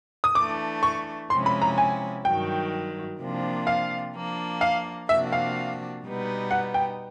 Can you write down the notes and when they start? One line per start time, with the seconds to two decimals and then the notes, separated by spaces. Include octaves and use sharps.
0.24 D#6
0.35 E3 A3 D4 D6
0.83 C#6
1.30 C3 F3 G#3 C#4 E4 C6
1.46 B5
1.62 A#5
1.78 G#5
2.25 G2 D#3 F#3 G5
3.20 C3 F3 A#3 D4 F4
3.67 F5
4.15 F3 A#3 D4
4.61 F5
5.09 C3 F3 A#3 D4 F#4 E5
5.32 F5
6.03 B2 G3 B3 D#4
6.51 F#5
6.74 G5